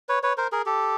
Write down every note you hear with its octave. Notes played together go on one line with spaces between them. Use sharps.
B4 C#5
B4 C#5
A#4 C5
G#4 A#4
G4 A4